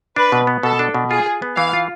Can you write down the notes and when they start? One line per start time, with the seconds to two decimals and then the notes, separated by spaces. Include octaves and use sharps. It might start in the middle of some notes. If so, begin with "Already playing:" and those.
0.16 D4 B4
0.32 B2
0.47 B3
0.63 B2 A4
0.79 D4
0.94 B2
1.10 F4 G#4
1.26 G#4
1.42 B3
1.57 E3 F5
1.73 F4